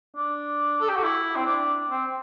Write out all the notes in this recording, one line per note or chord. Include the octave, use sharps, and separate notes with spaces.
D4
A4
G4
F#4
E4
C4
D4
C4